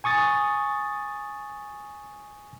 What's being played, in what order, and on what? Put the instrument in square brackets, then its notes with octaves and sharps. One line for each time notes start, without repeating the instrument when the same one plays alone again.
[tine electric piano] G#5 C#6 D#6 A6